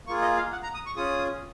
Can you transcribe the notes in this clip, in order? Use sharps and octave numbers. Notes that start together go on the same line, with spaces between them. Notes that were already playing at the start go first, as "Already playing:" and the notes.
A#3 F4 G#4 C#6
D#5
F5
F#5
A#5
D#6
C#6
C#4 F4 G#4 D#6